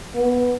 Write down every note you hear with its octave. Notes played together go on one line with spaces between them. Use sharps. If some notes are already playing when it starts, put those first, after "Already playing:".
B3